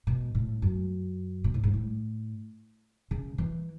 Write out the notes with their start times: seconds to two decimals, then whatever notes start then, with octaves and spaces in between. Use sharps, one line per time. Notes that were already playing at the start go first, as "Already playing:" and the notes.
0.07 B2
0.35 A2
0.62 F#2
1.44 B2
1.54 A2
1.64 G#2
1.74 A2
3.11 C#3
3.38 E3